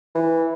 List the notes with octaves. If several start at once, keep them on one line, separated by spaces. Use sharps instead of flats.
E3